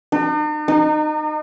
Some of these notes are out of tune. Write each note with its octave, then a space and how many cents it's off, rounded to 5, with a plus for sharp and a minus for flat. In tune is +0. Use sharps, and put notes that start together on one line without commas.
D#4 -45
D#4 -25